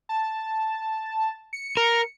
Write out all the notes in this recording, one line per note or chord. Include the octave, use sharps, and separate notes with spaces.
A5
C#7
A#4